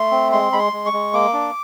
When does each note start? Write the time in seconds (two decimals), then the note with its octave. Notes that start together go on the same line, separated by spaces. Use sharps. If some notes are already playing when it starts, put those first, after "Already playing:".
Already playing: A3 C6
0.11 C4
0.32 G#3 C6
0.52 G#3 B5
0.59 C6
0.73 G#3
0.86 C#6
0.93 G#3
1.13 A#3 D6
1.33 D4